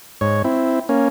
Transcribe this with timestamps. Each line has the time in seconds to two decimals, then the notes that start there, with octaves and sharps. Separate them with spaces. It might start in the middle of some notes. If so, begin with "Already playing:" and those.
0.21 G#2 C#5
0.44 C4 E4
0.89 A#3 C#4